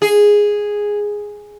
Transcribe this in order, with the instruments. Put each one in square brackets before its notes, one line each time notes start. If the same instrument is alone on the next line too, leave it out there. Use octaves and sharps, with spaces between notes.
[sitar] G#4